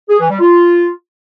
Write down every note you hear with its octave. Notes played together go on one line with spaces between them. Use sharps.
G#4
E3
G3
F4